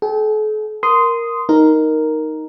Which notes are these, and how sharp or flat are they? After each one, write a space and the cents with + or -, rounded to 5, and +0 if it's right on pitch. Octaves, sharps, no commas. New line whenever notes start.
A4 -45 G5 -10
A#4 +0 C6 -15 D#6 +0
D#4 +5 A#4 +0